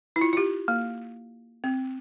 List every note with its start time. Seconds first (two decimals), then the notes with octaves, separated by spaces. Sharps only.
0.16 E4
0.21 F4
0.33 F4
0.37 G4
0.68 A#3
1.64 C4